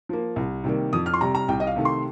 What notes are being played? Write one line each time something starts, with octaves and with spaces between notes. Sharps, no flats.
F3 A#3
C2
C3 D#3 G3 A#3
F2 D#6
F6
C6
C3 G3 A#5
A#5
C2 G5
D#5
F5
C3 D#3 A3
C6